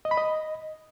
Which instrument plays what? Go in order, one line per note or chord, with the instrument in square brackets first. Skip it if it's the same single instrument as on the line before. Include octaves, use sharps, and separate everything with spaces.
[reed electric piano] D#5
B5
D#5